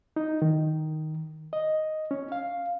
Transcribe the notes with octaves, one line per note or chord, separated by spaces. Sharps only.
D#4
D#3
D#5
C#4
F5